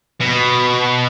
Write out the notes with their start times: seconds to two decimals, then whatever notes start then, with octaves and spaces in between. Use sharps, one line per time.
0.21 B2